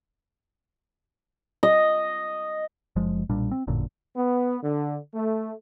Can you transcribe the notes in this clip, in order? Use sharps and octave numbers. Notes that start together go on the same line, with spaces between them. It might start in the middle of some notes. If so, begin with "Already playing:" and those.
D#5
F#1 F3 G#3
B1 A#2 G3 D4
C4
A1 F#2 A#2 D3
B3
D3
A3